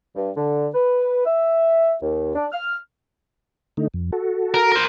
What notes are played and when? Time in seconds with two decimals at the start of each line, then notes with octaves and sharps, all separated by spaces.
0.16 G2
0.37 D3
0.74 B4
1.26 E5
2.02 D#2
2.35 D4
2.53 F6
3.77 D3 A3 D#4
3.94 F2
4.12 F#4 A4
4.54 A#4
4.72 A#4 C5